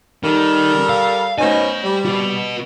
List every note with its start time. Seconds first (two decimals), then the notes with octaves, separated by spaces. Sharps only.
0.24 D#3 G3 A4 A#4
0.89 F5
1.38 B2 C#4 D#4 C5 G#5
1.84 G3
2.05 F#4 B4